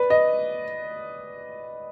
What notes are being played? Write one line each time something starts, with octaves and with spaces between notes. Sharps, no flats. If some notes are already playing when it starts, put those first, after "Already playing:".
Already playing: B4 D5
D#5